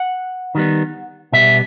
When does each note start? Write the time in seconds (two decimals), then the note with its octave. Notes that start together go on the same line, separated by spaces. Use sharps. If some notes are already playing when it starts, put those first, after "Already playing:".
Already playing: F#5
0.55 D#3 G3 B3
1.32 B2 G3 B3 E5